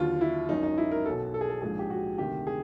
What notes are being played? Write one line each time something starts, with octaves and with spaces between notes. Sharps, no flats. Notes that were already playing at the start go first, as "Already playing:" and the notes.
Already playing: D#2 D3 F#3 F4
E4
G#1 F#2 D#3 D#4
D#4
E4
A#4
B1 B2 F#3 A4
A4
G#4
A4
A#1 G#2 F3 G#3 G#4
G4
F#4
D2 C3 D#3 F#3 G4
G#4